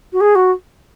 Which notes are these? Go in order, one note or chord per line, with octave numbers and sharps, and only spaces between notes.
F#4
G#4
F#4